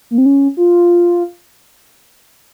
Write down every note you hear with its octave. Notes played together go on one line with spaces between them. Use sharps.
A#3
C4
C#4
F4